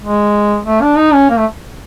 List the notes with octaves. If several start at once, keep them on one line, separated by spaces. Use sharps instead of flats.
G#3
A3
D4
D#4
C#4
A#3
A3